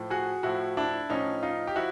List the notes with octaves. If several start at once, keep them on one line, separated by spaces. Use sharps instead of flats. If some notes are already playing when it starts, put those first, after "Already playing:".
Already playing: A2 F3
F#4 G#4
A2 F3 E4 F#4
D4 E4
A2 F3 C#4 D#4
D#4 F4
G4
F3 E4 F#4